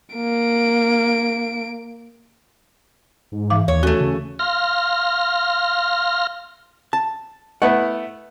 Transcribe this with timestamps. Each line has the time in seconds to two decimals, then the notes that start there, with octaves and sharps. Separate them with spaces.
0.16 A#3 D7
3.32 G#2
3.50 E3 F5 D6
3.68 D#2 C#5
3.83 A3 C#4 F#4 A4
4.00 C#3
4.39 F5 C6 F6 A#6
6.93 A5
7.62 A3 B3 E4 F#5